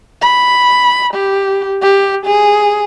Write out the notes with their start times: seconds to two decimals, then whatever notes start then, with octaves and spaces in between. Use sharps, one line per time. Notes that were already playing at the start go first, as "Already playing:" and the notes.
0.21 B5
1.14 G4
1.82 G4
2.26 G#4